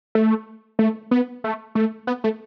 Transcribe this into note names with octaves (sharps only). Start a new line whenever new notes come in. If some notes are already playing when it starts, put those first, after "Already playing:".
A3
A3
B3
A3
A3
B3
A3